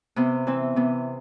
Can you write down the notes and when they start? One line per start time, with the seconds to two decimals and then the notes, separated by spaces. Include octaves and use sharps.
0.16 C3 B3
0.47 E3 C4
0.76 C3 B3